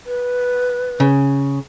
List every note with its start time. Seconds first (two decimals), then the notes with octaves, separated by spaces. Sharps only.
0.06 B4
1.00 C#3